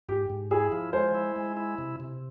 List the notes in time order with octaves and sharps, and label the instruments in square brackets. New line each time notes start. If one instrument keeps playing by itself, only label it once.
[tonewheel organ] G#2 [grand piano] G4
[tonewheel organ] G#2
[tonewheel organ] E4 [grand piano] G#4
[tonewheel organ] F3
[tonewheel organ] G#3 [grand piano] C5
[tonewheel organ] E4
G#3
E4
C3
C3